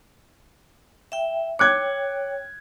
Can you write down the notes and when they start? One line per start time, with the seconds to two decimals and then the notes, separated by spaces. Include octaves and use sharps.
1.12 E5 G5
1.59 C#5 G5 D6 F#6 G#6